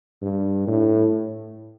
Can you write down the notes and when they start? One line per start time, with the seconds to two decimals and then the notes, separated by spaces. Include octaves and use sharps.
0.22 G2
0.67 A2